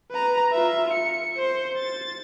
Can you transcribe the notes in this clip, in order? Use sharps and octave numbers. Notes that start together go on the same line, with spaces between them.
B4 A#5
F4 E5
C#7
C5
A6